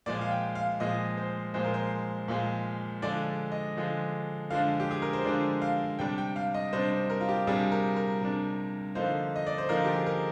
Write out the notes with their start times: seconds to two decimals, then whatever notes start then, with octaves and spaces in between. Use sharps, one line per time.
0.06 A#2 F3 G#3 D5
0.21 F5
0.31 G5
0.55 F5
0.80 A#2 F3 G#3 D#5
1.17 C5
1.54 A#2 F3 G#3 C5
1.65 A#4
1.74 C5
2.28 A#2 F3 G#3
3.02 D3 F3 G#3 D4 D5
3.52 D#5
3.77 D3 F3 G#3 D4
4.50 D3 F3 G#3 D4 F5
4.80 G4
4.91 G#4
5.02 A#4
5.13 C5
5.24 D3 F3 G#3 D4 D5
5.62 F5
5.99 C3 G3 D4 G5
6.18 G5
6.36 F5
6.54 D#5
6.73 C3 G3 D4 C5
6.91 C5
7.10 A#4
7.21 F4
7.29 G4
7.47 C3 G3 D4 G#4
7.72 A#4
7.96 A#4
8.21 C3 G3 D4
8.95 D3 F3 A#3 D#4 C5
9.36 D#5
9.47 D5
9.58 C5
9.69 D3 F3 A#3 D#4 A#4
9.85 G4
9.95 G#4
10.07 A#4